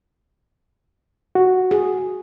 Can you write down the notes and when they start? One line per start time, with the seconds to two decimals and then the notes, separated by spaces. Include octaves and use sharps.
1.35 F#4
1.71 G#4